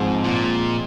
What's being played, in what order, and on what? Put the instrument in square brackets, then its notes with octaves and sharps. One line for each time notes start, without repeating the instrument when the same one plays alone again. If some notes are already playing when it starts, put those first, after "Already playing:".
Already playing: [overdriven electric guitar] G#2 [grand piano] F3 G#3 C4
[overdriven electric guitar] A#2